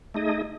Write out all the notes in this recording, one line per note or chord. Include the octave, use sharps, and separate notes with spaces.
A3 D#4 G#4 D#5